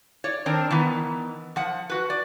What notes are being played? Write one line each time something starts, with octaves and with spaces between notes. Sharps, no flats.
C#5 D5
D#3 C4 D4 A#4 C5
D#3 E3 B3
F3 F#5
F#4 B4
D5